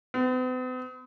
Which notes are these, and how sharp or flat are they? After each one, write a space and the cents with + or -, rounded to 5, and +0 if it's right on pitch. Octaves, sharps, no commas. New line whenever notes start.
B3 +45